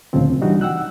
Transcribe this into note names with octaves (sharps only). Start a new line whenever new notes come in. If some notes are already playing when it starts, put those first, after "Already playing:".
D2 A#2 C#3 F3 C4
E3 G3 D4 D#4 F#4
F#5 G5 E6 F#6